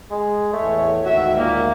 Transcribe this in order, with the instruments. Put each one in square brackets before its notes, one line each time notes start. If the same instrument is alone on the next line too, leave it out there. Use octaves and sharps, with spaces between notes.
[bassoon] G#3
[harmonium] E2 A2 C#5 [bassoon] A3
[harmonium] D2 G#2 D#3 [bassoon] F#4 [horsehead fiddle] E5
[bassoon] A#2 [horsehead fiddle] A#3